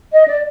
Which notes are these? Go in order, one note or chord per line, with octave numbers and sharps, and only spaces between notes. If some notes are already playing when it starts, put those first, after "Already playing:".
D#5
D5